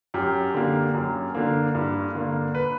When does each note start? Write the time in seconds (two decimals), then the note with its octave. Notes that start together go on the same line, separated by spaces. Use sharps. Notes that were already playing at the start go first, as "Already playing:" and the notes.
0.14 F#2 G4
0.54 D3 A#3
0.94 F#2
1.35 D3 A#3
1.75 G2
2.15 D3 A#3
2.55 B4